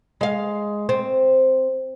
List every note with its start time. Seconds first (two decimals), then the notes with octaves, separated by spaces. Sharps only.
0.21 G#3 F5
0.89 C4